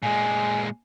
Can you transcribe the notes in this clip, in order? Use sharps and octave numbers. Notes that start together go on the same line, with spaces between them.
A#2 G#3 G#5